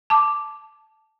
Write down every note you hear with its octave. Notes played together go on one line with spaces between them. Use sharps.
A5 D6